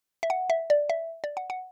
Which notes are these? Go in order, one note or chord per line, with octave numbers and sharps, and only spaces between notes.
E5
F#5
E5
D5
E5
D5
F#5
F#5